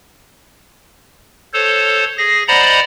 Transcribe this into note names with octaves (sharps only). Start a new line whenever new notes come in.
A4 C5 C#5
G#4 A#6
C5 D5 D#5 F#5 A#5 B5